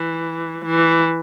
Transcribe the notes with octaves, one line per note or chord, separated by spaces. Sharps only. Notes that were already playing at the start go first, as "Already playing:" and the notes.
Already playing: E3
E3